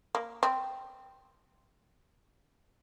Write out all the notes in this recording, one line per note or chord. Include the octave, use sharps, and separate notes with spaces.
A#3
C4